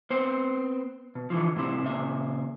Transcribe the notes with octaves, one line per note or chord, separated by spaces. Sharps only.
B3 C4 C5
B2
D3 E3 F3
A2 C3 C4 E4
A#2 C#3 E5